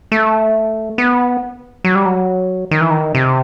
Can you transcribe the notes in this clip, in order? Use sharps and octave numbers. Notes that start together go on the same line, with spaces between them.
A3
B3
F#3
G3
F#3
D#3
E3
D#3
C3